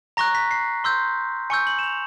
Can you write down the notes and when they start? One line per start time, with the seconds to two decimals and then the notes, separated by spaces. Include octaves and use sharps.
0.17 A#5 C#6 F#6 A#6
0.35 B6
0.51 C7
0.84 C6 E6 G6
1.50 G#5 C#6 E6 G6 C#7
1.67 F#7
1.79 E7
1.84 F7